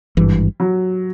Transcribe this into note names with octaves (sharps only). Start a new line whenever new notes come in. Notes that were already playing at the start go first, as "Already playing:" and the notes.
G#1 G2 E3
F#3